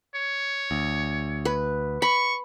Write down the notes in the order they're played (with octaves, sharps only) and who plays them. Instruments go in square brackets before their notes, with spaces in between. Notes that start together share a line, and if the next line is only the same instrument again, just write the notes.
[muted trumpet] C#5
[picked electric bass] D2
[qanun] B4
[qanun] B5 [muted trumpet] C#6